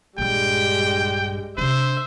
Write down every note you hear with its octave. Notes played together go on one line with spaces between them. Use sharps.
A#1 G2 G3 G#3 G5
C3 D4 C5 E5